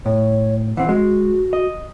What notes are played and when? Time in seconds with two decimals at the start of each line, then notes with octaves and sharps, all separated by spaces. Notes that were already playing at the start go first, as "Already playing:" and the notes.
0.06 A2 C#5
0.77 E3 C4 F#5
0.89 G#3 F#4
1.53 D#5